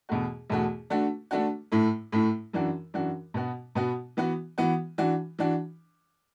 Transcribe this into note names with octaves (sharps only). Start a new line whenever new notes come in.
E2 B2 A3 F#4
E2 B2 A3 F#4
D3 A3 D4 F#4
D3 A3 D4 F#4
A2 A3 E4
A2 A3 E4
F#2 E3 D4 F#4
F#2 E3 D4 F#4
B2 B3 F#4
B2 B3 F#4
E3 B3 F#4
E3 B3 F#4
E3 D4 F#4
E3 D4 F#4